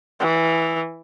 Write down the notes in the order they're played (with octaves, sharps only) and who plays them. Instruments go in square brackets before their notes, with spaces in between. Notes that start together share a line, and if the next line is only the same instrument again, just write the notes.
[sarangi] E3